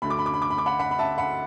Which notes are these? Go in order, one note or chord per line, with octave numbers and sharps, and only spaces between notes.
D2 D3 B5
D6
B5
D6
B5
D6
B5
D6
F#5 B5
F#5 B5
B5
E5 A5
F#5 B5